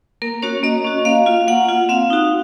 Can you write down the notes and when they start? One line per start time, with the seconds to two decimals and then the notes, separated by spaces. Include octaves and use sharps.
0.22 A#3 A#4
0.42 C#4 F#4 C#5
0.63 A#3 D#5
0.85 C#4 F#4
1.05 A#3 F5
1.26 F4
1.48 A#3 F#5
1.69 F4
1.89 C4 F5
2.10 D#4 F#4